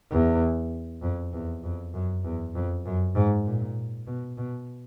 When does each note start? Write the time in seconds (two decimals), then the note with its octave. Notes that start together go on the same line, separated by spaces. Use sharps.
0.11 E2
1.02 F2
1.33 E2
1.64 F2
1.94 F#2
2.24 E2
2.55 F2
2.85 F#2
3.15 G#2
3.45 A#2
4.06 B2
4.37 B2